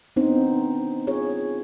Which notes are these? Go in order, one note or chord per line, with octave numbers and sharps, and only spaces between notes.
B3 C4 D4 D#4 C5
F4 G#4 C#5